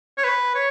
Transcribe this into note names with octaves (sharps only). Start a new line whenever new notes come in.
C#5
B4
C#5